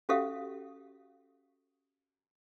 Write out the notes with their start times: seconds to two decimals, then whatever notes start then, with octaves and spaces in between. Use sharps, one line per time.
0.09 C#4 F#4 G4 A4 E5 F5